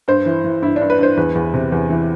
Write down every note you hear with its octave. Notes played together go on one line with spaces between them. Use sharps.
G2 C5
E3
E3
G2 E4
D4
G2
B4
G2 C5
E2 B4
E2
C3
E2
E3